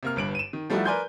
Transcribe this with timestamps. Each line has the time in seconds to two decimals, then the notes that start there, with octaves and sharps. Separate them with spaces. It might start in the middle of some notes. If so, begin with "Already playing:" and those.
0.03 C3 A#3 F6
0.16 G1 G2 D7 F#7
0.35 D#7 E7
0.53 D#3
0.70 F3 G3 A3 D#4 E4 F#4
0.85 A#4 B4 D5 G#5 C6 G6